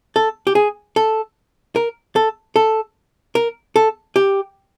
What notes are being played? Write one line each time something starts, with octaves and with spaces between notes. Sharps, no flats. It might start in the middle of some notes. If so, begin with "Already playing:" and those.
A4
G4
G#4
A4
A#4
A4
A4
A#4
A4
G4